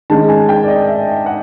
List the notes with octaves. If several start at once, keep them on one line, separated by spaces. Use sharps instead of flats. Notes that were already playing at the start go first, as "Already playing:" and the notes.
D#3 G#3 C#4 A5
G#5
G5
D5
D#5
E5
F#5